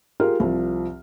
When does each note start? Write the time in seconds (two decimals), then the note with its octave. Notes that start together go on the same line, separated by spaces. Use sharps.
0.20 F4 G4 G#4 A#4 F6
0.40 C2 F3